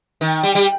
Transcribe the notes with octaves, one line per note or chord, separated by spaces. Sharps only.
D#3
G3
G3